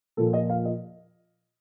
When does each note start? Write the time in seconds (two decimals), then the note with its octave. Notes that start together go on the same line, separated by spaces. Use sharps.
0.17 A#2 F3 A4
0.33 D#5
0.50 F5
0.65 D#5